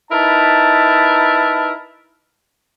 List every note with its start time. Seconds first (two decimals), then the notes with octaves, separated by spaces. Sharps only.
0.11 D#4 E4 A#4 B4 A5